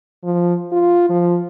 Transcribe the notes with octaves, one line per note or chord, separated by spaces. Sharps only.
F3
F4
F3